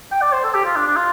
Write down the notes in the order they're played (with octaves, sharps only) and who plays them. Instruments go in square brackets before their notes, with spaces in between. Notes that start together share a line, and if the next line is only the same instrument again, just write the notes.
[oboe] G5
D5
C5
A4
G4
F4
D4
D4
F4